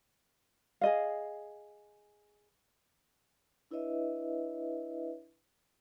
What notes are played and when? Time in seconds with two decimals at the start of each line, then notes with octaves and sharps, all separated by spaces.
0.81 G#4 D#5 F5
3.71 D4 E4 B4 C#5 D#5 E5